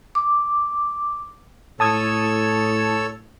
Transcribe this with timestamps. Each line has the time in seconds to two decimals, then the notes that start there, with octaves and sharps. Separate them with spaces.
0.15 D6
1.80 A2 A4 C#5 A5 D#6 E6 G#6